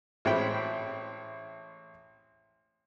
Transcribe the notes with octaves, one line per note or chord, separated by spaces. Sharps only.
A1 G#3 C4 G5 B5